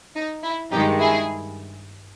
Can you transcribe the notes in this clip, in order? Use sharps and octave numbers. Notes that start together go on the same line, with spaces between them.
D#4
E4
G2 D#3 G#3 D#4 G4
E4 G#4